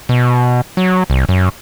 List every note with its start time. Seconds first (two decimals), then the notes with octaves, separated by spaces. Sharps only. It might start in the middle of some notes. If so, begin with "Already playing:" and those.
0.09 B2
0.77 F#3
1.10 C2
1.29 F#2